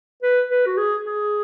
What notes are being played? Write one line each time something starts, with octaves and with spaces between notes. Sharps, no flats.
B4
B4
F#4
G#4
G#4